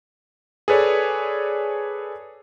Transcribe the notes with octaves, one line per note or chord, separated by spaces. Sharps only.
G#4 A4 B4 C#5 D5